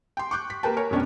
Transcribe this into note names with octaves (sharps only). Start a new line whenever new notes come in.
G5 C6
C#6 D6 F#6 G6
B6
A#3 G4 A#4 B4 G5 A5
A#4 C#5 G#5
F1 B2 C#4 D4 G4 A#4